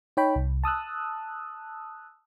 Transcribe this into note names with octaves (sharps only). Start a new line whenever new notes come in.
D#4 C#5 G5 B5
C2
A5 D#6 E6 F#6